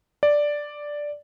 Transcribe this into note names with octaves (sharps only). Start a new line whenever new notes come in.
D5